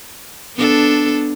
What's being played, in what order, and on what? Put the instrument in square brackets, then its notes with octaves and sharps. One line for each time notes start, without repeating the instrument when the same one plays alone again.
[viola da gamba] B3 D4 A4